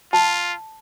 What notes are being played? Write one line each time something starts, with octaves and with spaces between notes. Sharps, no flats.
F4 A5